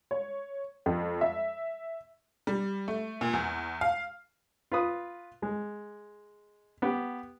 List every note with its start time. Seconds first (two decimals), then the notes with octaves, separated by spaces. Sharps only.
0.11 C#5
0.86 F2
1.21 E5
2.47 G3
2.88 A3
3.21 A#2
3.33 E2
3.81 F5
4.72 F4 B4 D#6
5.42 G#3
6.82 B3 G4